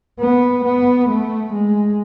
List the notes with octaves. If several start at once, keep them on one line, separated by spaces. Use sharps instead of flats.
B3
B3
A3
G#3